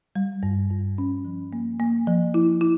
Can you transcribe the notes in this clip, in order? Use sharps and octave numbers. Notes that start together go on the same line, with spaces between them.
G3
G2
G2
C#4
F3
A#3
A#3
F3
E4
E4